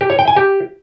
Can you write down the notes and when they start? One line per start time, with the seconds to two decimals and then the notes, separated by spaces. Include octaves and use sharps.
0.01 G4
0.10 C#5
0.19 G5
0.28 G#5
0.37 G4